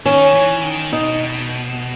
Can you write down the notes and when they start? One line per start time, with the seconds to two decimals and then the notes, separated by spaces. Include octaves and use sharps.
0.06 D#3 C#4
0.34 E3
0.63 D#3
0.92 B2 D#4